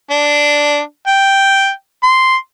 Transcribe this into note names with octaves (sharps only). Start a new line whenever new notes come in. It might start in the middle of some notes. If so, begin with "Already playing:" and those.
D4
G5
C6